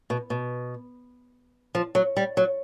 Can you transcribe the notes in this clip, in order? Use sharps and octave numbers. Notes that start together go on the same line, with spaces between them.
B2
B2
F3
F#3
G3
F#3